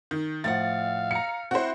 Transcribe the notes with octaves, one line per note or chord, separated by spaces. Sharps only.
D#3
A2 F3 F5 F#5 A6
A#5 C#7
C4 E4 F#4 C5